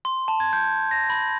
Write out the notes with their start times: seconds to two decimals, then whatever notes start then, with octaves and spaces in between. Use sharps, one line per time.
0.05 C6
0.28 A5
0.40 G#6
0.53 G6
0.91 A#6
1.10 B5